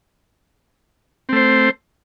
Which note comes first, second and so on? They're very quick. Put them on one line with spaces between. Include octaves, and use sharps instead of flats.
C4 A3 C5